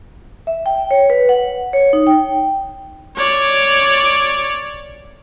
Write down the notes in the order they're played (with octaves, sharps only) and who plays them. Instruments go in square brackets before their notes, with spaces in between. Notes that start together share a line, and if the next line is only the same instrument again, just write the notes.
[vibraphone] E5
G5
C#5
B4
F#5
C#5
D#4
G5
[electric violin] C#5 D5